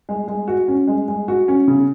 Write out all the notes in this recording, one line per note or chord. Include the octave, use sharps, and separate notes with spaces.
G#3
G#3
F#4
C#4
G#3
G#3
F#4
C#4
C#3